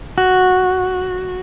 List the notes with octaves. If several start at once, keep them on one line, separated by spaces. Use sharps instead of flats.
F#4